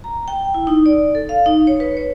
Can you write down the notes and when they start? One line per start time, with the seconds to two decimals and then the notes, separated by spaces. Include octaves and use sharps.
0.04 A#5
0.28 G5
0.54 E4
0.67 D#4
0.86 D5
1.15 A4
1.29 F5
1.46 D#4
1.67 C#5
1.80 B4
1.97 C#5